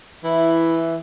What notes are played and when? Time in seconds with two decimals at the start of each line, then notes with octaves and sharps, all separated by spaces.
0.24 E3 E4